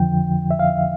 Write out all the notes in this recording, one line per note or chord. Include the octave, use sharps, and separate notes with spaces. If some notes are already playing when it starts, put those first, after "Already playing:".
Already playing: F2 D3 F3 G5
E5
F5